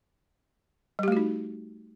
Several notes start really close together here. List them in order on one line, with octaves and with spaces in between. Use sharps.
G3 G4 A3 F#4 D#4